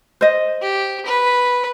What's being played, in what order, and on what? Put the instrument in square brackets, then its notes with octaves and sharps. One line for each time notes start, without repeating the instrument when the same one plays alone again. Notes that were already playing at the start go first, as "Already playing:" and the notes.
[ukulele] C5 D#5
[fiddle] G4
B4